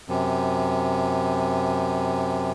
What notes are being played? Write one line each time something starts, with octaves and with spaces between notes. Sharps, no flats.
F#2 C3